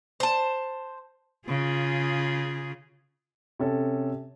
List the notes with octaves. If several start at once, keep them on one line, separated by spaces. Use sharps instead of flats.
C5 A5
C#3 F4 G#4
C3 C#4 A4